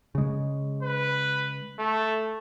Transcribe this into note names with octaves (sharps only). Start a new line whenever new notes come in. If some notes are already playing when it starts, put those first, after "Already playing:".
C#3 G#3
B4
A3